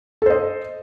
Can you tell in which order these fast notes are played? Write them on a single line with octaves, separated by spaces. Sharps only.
A4 C5 D#5